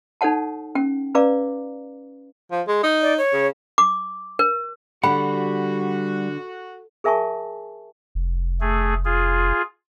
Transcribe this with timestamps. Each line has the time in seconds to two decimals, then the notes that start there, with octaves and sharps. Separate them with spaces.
0.21 D#4 A4 C#5 F#5 A5
0.75 C#4 G5
1.15 C#4 B4 D5 F5 A#5 D6
2.51 F3
2.68 G#3
2.83 D#4
3.02 D5
3.17 C#5
3.34 C#3
3.78 D6
4.39 A#4
5.03 D3 G3 F#4 F#5 B5
7.04 G#4 A#4 E5 G#5 A5 C#6
8.15 F1
8.61 A3 G#4
9.05 F4 G#4